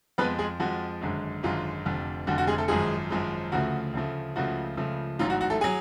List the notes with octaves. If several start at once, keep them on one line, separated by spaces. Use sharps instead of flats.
F2 F3 G#3 B3 B4
G#3 G#4
F2 F3 G#3 F#4
G#1 F#2 D3 G#3
G#1 F#2 D3 G#3 F4
F1 F2 D3
F1 F2 D3 F#4
F#4
G#3 G#4
A3 A4
G#1 F#2 F3 G#3 G#4
G#1 F#2 F3 G#3
D2 C#3 F3 A3 F#4
D2 C#3 F3 A3
C#2 C#3 F3 A3 F#4
C#2 C#3 F3 A3
A1 G#2 F#3 F4
F#4
F#4
A3 A4
F#3 G#4 G#5